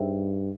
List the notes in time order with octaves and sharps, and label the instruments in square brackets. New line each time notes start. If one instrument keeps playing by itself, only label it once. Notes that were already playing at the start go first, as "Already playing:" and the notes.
Already playing: [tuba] G2 [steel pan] D#4 G#4 C5 E5 G5